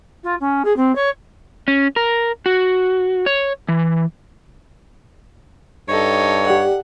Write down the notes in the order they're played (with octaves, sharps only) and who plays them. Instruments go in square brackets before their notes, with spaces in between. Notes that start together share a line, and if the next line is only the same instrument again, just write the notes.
[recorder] F4
C#4
G#4
C4
C#5
[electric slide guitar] C#4
A#4
F#4
C#5
E3
[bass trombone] G2 [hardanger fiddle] D#4 A4 [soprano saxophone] C#5
[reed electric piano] G4 D5 [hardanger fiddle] F#5